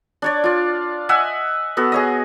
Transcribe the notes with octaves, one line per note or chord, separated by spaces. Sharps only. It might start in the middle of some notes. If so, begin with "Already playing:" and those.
D4 C#5 D5
F4 D5
D#5 E5 F#5 G#5
B3 F#4 A4
G#4 C#5 D#5